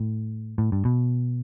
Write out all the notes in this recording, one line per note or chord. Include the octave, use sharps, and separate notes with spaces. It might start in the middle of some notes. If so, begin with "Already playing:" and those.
Already playing: A2
A2
G2
B2